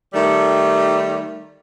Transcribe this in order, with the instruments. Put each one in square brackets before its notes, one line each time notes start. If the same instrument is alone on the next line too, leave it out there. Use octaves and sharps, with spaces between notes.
[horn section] D#3 G3 A3